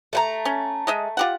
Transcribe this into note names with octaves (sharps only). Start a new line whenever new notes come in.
A3 F#5 A#5
C#4
G#3 D#5 E5
F4 G4 F#5